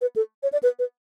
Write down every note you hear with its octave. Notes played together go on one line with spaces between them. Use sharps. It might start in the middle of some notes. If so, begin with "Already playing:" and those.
B4
A4
C#5
D5
B4
B4